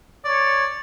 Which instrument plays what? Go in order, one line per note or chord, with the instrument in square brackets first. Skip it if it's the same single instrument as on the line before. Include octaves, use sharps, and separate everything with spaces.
[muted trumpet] C#5 [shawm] D5